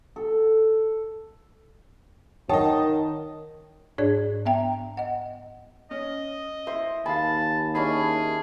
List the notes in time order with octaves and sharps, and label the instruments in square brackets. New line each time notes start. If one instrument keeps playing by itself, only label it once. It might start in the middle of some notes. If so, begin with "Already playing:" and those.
[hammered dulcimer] A4
[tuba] D#3 [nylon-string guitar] C#5 [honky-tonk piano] D#5 A5 [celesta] F#5 G5 D#6
[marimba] G#2 D4 G#4 C#5 D5 G#6
B3 E5 G5 A#5
D#5 F#5
[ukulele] C#4 [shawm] D#5
[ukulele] E4 E5 [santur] C5
[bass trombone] D#2 [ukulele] F5 G#5 [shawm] A5 [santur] B5
[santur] C#4 D4 B5 [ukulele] E4 D#5 [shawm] G#4